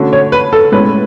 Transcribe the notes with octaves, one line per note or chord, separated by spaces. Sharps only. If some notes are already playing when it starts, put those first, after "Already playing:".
Already playing: D3 A3 C#4 F#4
C#5
B4
A4
A2 G#3 C#4 B4